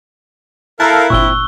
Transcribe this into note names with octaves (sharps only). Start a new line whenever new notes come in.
E4 A4 A#4 F5 A5 A#5 F#6
G1 A#2 C4 C#6 E6 G7